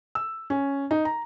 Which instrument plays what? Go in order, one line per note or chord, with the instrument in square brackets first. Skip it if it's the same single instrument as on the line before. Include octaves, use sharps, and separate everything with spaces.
[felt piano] E6
C#4
D#4
A#5